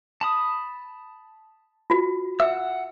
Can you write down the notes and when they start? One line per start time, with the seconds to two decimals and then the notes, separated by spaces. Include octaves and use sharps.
0.21 A5 B5 D#6
1.90 F4 F#4
2.40 E5 F#5 E6